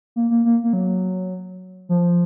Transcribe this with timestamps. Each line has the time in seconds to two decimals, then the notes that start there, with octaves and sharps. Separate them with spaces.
0.16 A#3
0.31 A#3
0.45 A#3
0.64 A#3
0.73 F#3
1.89 F3